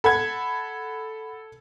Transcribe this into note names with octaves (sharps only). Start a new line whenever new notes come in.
A4 F#5 B5 G#6